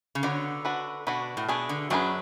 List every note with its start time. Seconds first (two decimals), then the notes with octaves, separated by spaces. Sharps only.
0.15 C#3
0.23 D3 B3 F#4 C#5
0.65 D4 F#4 B4
1.07 B2 D4 F#4 B4
1.37 A2
1.49 B2 D4 G#4 B4
1.69 D3
1.90 F#2 F#3 D4 G#4 B4